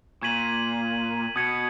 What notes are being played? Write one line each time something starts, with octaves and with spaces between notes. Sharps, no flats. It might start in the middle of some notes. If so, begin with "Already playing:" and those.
A#2 C#6 G#6 B6 D#7 F#7
B2 D#6 G#6 C#7